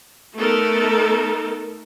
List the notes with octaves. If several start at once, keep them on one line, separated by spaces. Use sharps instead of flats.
A3 B3 D#4 A4 A#4